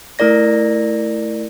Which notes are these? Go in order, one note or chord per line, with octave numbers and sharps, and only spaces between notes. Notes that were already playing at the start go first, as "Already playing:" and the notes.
A3 E4 A#4 D5 A#6